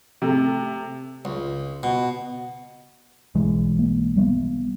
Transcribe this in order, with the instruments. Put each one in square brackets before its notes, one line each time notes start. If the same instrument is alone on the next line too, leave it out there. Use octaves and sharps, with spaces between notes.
[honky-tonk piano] C3 A3
[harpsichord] C#2
B2
[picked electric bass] B1 E3 G#3
[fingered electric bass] A#3
G3 B3